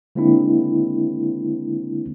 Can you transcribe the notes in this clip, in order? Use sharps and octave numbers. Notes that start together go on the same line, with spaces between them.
D3 G#3 A#3 C4 D4 E4